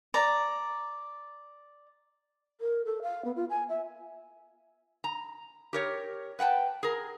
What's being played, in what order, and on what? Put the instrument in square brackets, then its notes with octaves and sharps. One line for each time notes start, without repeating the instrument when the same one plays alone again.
[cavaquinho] D5 A#5
[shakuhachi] A#4
A4
F5
B3
F4
G#5
E5
[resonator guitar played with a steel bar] A#5
G4 A#4 C#5
B4 F#5 G5 A5
G#4 A#4